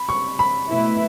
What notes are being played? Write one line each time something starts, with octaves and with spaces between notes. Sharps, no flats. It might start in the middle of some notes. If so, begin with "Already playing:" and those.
Already playing: B5
C#6
B5
B2 A3 E4 B4